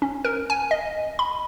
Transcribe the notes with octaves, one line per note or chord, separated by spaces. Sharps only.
C#4
A#4
G#5
D#5
B5